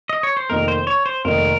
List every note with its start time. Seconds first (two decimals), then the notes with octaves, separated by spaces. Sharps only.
0.09 D#5
0.23 C#5
0.37 C5
0.50 F1 F2 D#3 A#3 D#4 A#4
0.68 C5
0.87 C#5
1.06 C5
1.25 F1 F2 D#3 A#3 D#4 A#4